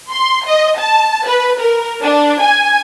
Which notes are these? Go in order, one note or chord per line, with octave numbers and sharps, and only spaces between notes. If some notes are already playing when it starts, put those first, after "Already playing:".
C6
D#5
A5
B4
A#4
D4
G#5